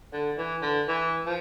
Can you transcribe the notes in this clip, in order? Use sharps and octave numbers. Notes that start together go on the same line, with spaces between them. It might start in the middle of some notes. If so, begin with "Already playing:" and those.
D3
E3
D3
E3
F3